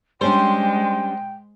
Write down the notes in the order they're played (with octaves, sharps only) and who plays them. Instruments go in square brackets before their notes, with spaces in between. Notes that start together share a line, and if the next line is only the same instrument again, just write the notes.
[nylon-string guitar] G3 C#4 D4 [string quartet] G#3 [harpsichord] C5 [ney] G5